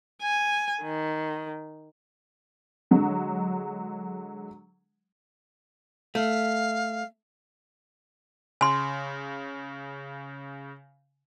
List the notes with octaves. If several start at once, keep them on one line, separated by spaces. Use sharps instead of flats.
G#5
D#3
D3 F#3 G#3
A3 F5
C#3 G#5 C6